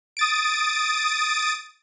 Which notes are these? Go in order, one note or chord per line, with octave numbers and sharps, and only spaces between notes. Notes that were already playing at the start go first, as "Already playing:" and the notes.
D#6 A6 D7